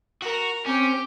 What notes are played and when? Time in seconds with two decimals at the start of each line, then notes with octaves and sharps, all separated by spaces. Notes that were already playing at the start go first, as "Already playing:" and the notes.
0.22 F#4 A#4
0.66 C4 C#4 G4